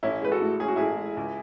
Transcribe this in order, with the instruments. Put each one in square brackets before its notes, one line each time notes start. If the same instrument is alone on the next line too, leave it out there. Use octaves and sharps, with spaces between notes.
[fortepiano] A1 [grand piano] C#4 E4
[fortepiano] G#3 [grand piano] B4
[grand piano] F#4 A4
[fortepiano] A2
[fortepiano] C#4 [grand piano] G#4
[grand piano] F#4
[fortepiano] A1 [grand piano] E4 G#4
[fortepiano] G#3
C#2